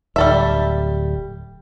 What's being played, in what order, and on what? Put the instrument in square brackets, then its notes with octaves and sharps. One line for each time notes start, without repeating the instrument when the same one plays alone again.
[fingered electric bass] D1 [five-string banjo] G3 A4 E5